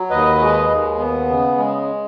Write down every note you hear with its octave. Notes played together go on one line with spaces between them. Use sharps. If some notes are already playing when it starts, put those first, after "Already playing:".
Already playing: F#3
D#2 B4 D#5
G#3
D#2
B3
C#3
G#3